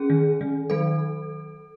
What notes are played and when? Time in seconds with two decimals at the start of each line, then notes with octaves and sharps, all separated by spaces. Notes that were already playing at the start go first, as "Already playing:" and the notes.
Already playing: C#4 G#4
0.10 D#3
0.41 D#3
0.70 F#3 A4